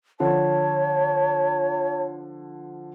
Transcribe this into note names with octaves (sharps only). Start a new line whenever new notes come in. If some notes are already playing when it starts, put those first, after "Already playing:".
D3 F3 C#5 A5